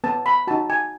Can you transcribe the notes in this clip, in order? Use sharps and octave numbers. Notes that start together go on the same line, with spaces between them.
B3 A5
B5
D#4 F#4 A5
G#5